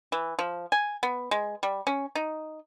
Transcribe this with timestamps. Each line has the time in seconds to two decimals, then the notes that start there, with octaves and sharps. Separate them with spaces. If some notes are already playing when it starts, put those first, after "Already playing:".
0.12 E3
0.39 F3
0.72 G#5
1.03 B3
1.31 G#3
1.63 G3
1.87 C#4
2.15 D#4